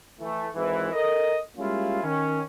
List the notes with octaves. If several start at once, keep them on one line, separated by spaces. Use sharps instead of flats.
E3 A3
G#1 G#2 E3
A4 A#4 D#5
G3 G#3 A#3 C#4 E4 F4
D#3 C#4